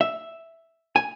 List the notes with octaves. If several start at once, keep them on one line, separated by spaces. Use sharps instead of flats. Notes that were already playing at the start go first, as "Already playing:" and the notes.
E5
G#5